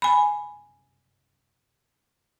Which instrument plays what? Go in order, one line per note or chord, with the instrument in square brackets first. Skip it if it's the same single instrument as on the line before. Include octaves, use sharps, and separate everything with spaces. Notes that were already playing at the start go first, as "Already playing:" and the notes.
[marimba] G#5 B5